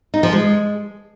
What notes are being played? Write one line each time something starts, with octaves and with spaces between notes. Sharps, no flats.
D#4
F3
G#3